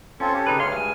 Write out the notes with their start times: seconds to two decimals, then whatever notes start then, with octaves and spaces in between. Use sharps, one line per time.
0.20 C4 C#4 F4 A4
0.34 G4 A4
0.47 C#3 D#4 B4
0.60 D2 G2 C#5 F5 C6 F6
0.72 G#3 G#5